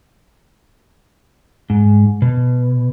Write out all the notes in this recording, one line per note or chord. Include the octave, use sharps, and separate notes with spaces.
G#2
B2